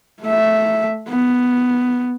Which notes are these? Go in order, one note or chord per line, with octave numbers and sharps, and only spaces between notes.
A3 E5
B3